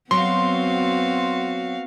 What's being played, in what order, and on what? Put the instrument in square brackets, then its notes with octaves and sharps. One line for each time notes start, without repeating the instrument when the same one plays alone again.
[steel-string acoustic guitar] F#3 [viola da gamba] B3 C4 [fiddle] F#4 F5 [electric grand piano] C6